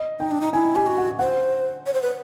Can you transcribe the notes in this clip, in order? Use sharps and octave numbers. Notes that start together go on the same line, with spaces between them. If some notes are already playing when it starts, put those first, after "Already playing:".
Already playing: D#5
D#4 G5
D4
D#4
E4 G#5
G4 G#5
F#4
F#5
C5 F#5
C#5
C5
B4